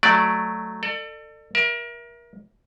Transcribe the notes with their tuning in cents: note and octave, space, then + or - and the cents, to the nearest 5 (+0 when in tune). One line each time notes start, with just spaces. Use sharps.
F#3 +0 A3 +0 D5 +0
A4 +30 D5 +40
A#4 +30 E5 +0